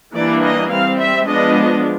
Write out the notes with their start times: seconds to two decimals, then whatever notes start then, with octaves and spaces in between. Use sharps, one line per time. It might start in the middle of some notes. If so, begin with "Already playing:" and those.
0.14 E3 G3 A#3 D4 D5
0.43 D#5
0.70 G3 C4 F5
0.99 E5
1.27 F3 G#3 B3 D4 D#5